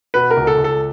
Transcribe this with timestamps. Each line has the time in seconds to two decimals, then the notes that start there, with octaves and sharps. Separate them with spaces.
0.14 B2 B4
0.31 A#4
0.37 C#2
0.47 A4
0.58 C#2
0.64 A4